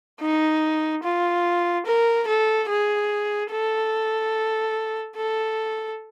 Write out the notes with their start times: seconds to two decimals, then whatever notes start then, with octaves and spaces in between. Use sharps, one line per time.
0.20 D#4
1.03 F4
1.86 A#4
2.27 A4
2.69 G#4
3.51 A4
5.16 A4